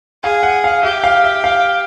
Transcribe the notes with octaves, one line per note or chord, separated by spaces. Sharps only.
G#4 F5
F#5
F5
G4 E5
F5
E5
F5